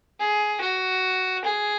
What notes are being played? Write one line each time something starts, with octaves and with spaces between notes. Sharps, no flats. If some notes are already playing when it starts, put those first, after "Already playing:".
G#4
F#4
G#4